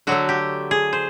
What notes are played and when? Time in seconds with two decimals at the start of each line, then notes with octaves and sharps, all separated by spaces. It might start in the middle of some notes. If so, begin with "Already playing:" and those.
0.07 D3 F#3 A3 F#4
0.29 G4
0.71 G#4
0.93 C5